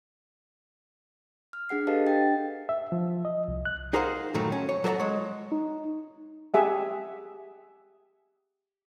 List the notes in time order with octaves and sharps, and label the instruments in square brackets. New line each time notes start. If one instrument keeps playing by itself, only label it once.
[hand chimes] F6
D4 G#4 F#5 C7
G4 A4 B4 D#5 F5 A5
D4 G5 A6
[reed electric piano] E5
F3
D#5
C2
F#6
[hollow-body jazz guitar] D#4 G#4 A#4 C5 F5 F#5
G2 A#2 D#3 F#3 A3
C#4
C#5
F#3 A4 A#4 C#5 F#5 A#5
G#3 C#5
[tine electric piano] D#4
[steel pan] G4 G#4 E5 F#5